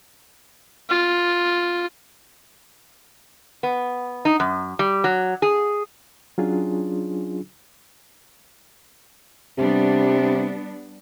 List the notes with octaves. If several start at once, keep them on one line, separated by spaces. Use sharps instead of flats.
F4
B3
D#4
F#2
G3
F#3
G#4
F#3 C#4 D4 F4 G#4
C3 G3 B3 D4